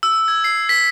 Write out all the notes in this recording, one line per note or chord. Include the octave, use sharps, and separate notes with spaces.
E6
G#6
C7
B6